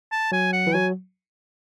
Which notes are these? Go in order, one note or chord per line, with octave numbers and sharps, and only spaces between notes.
A5
F#3 G#5
F#5
E3
F#3 G#5